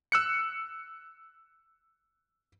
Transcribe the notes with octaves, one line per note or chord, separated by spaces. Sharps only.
E6 F#6 C#7